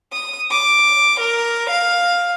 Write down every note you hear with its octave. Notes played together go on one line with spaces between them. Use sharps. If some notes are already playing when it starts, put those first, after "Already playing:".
D#6
D6
A#4
F5